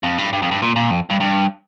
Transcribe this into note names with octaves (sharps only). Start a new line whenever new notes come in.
F2
G2
G2
F2
G2
A#2
A#2
F2
G2
G2